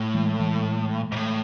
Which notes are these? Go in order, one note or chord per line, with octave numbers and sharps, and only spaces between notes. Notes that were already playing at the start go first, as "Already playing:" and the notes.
Already playing: A2
E3 G#3
E3 G#3
G#2
A2